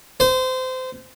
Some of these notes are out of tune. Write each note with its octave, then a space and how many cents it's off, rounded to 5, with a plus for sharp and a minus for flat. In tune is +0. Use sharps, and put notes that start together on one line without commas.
C5 -25